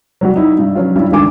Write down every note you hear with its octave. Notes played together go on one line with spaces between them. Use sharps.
F#3 G3 F#4
D#4 E4
G2
F#3 C#4 F4
G2 G3 E4
C#2 G2 D3 D#3 G#5 D6